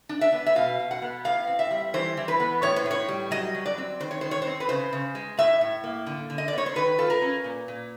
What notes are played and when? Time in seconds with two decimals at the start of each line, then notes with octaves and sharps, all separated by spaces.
0.09 D4
0.21 E5
0.32 B3
0.46 E5
0.55 B2 F5
0.79 B2
0.91 F#5
1.02 B3
1.24 A2 F5
1.47 C4
1.59 E5
1.71 G3
1.94 E3 C5
2.17 E3
2.28 B4
2.40 B3
2.62 A2 C#5
2.76 C5
2.86 A2
2.91 C#5
3.08 G3
3.31 F#3 D#5
3.54 F#3
3.66 D5
3.78 C4
4.00 D#3 C5
4.11 C#5
4.21 D#3 C5
4.31 C#5
4.42 C5
4.47 C4
4.60 B4
4.69 C#3 C5
4.93 C#3
5.15 G#3
5.37 A2 E5
5.61 A2
5.84 A#3
6.06 D3
6.30 D3
6.38 D#5
6.48 D5
6.53 B3 C#5
6.66 C5
6.75 D#3 B4
6.99 F4 A4
7.10 A#4
7.22 C#4
7.44 A#2
7.68 A#2